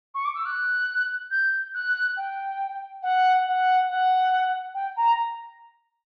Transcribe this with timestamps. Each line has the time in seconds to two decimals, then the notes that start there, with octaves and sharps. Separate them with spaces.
0.15 C#6
0.25 D6
0.35 E6
0.46 F#6
1.30 G6
1.74 F#6
2.17 G5
3.03 F#5
3.46 F#5
3.89 F#5
4.74 G5
4.96 A#5